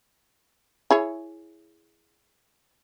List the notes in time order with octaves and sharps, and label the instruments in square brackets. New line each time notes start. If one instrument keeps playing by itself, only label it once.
[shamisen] E4 G#4 C#5